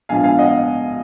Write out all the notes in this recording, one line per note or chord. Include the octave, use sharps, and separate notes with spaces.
A#1 G#2 F3 B3 F5 G#5
F5 G#5
D#5 F#5